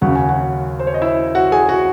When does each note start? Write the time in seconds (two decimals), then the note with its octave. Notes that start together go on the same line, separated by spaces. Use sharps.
0.01 D#2 C#3 F#3 F#5
0.15 G#5
0.29 F#4 F#5
0.79 C5
0.87 C#5
0.94 D#5
1.02 E4 E5
1.35 F#4 F#5
1.52 G#4 G#5
1.69 F#4 F#5